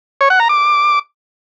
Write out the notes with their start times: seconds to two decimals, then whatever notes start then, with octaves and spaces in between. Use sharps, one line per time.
0.21 C#5
0.30 F#5
0.40 A#5
0.49 D6